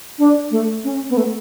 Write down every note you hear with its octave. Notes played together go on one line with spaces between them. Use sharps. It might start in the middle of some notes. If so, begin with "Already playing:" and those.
D4
A3
C#4
B3
A3